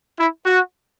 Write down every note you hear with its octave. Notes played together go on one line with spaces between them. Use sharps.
E4
F#4